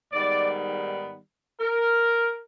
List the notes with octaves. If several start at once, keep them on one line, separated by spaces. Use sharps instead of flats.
G#2 D#3 G3 B3 D#4 D5
A#4